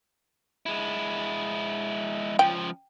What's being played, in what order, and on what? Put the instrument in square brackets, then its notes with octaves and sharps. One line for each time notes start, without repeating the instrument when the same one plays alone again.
[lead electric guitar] G#3 E4
[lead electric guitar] C#2 F3 [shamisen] G5